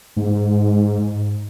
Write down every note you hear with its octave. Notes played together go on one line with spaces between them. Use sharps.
G#2